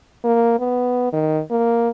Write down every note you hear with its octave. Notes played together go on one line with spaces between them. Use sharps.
A#3
B3
D#3
A#3